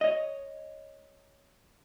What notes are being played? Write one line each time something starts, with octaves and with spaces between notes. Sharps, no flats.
C#5 D#5